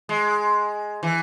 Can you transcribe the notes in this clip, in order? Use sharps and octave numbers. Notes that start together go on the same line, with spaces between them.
G#3
E3